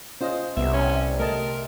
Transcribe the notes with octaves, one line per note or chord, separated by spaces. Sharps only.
C#4 F4 C5 D#5
C2 C3 B3 E5
C#4
A3 A#4 D#5 A5